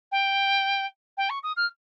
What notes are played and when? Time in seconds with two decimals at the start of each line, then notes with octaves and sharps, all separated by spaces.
0.11 G5
1.17 G5
1.30 C#6
1.43 D#6
1.56 F6